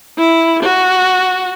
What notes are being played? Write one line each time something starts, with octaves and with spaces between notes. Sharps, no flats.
E4
F#4